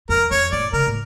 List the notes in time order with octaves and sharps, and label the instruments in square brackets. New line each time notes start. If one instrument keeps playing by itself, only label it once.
[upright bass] F2 [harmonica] A#4
[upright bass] F2 [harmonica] C#5
[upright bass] A2 [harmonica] D5
[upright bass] C#3 [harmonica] A#4
[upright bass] A2